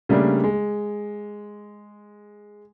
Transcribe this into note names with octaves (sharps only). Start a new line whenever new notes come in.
C#3 G3 A3 A#3 D4
G#3